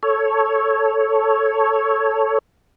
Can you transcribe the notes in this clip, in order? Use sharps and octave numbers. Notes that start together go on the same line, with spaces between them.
A4 C#5